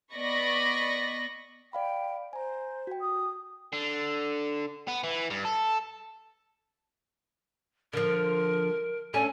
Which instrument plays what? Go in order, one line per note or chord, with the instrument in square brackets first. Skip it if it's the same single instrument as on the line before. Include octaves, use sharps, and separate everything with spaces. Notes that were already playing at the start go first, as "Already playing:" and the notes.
[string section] B3 D5 D#5 B5 C#6 A#6
[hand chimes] D5 F5 B5 [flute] G5
[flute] C5 [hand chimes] G#5 A#5
[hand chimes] F#4 G5
[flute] D#6
[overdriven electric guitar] D3
B3
E3
G2
A4
[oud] D3 F3 [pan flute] A#4
[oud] A3 C#4 D4 [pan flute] G#5